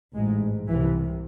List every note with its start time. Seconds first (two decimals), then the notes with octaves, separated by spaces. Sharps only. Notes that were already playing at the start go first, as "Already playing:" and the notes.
0.14 A1 G#2 G#3
0.67 C2 C3 E3